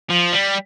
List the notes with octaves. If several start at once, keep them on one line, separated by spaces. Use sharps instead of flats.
F3
G3